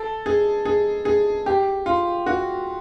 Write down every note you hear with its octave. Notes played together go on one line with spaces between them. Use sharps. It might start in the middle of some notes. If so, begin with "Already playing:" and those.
Already playing: A4
G#4
G#4
G#4
G4
F4
F#4